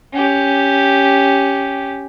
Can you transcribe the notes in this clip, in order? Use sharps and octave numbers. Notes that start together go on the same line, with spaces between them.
C#4 G4